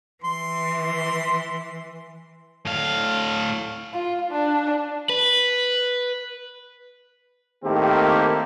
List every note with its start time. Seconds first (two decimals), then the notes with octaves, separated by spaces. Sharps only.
0.24 E3 C6
2.66 A2 F5
3.93 F4
4.31 D4
5.09 B4
7.64 A2 D#3 A#3 C4 G4